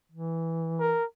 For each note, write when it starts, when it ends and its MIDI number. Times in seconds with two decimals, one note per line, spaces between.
0.12 0.98 52
0.80 1.04 70